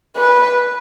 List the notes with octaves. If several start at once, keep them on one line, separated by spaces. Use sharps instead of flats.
B4